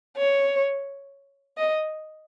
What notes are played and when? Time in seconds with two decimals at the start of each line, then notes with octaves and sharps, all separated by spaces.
0.17 C#5
1.58 D#5